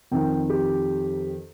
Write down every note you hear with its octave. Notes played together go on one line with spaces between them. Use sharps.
F2 D#3 G5
G4